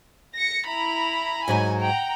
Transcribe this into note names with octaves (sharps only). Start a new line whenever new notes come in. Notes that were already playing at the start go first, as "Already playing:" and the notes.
A#6 C#7
E4 A#5 B5
G#2 F#3 D#4 G#5
F#5 G5 A#5